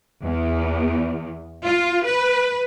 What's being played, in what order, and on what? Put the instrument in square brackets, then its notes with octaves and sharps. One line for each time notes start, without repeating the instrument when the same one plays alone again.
[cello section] E2
F4
B4